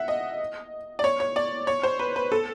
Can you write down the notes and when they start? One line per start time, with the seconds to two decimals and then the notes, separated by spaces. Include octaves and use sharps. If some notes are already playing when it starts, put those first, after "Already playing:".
Already playing: E5 F#5
0.08 D#5
0.99 D5
1.04 C#5
1.20 C#5
1.36 D5
1.67 C#5
1.83 C5
1.99 B4
2.16 B4
2.32 A4